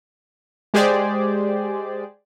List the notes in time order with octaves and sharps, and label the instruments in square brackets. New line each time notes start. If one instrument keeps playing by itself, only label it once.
[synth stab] G#3 G4 G#4 C5 D5